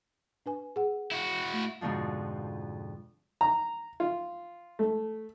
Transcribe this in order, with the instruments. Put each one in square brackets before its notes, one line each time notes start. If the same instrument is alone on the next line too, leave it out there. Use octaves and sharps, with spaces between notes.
[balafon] D4 B4 G#5
G#4 F#5
[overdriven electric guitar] E4 F#4
[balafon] A3
[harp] F2 G#2 B2 D3 F3
[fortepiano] A#5
F4
A3